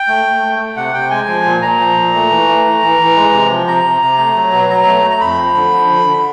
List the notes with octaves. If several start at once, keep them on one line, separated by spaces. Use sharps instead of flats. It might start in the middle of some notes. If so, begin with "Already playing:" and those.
Already playing: G5
A3
A3
A3
A3
C3 F#5
C3 G5
G#3 G#5
F3
A#2
A#2 A#5
F3
A#2
A3
E3
A3
E3
E3
E3
G#3
C3
F3
C3 A#5
C3
C3
A3
F#3
B2
F#3 A#5
A3
A3
A#5
F2 B5
F3
D3
F3
D3
D3